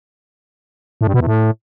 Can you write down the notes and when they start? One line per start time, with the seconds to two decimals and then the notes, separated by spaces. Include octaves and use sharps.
1.01 A2
1.07 G2
1.14 B2
1.20 E2
1.27 A2